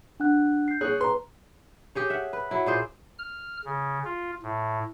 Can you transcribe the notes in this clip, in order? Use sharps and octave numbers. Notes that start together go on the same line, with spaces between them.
D4 F#5 F#6
G6 C7
G#4 C#5 F#6
B4 A#5 C6
G4 G#4 C#5
E5 F#5
B4
F#3 E4
A#2 G#4 C5 D5
F6
C#3
F4
A2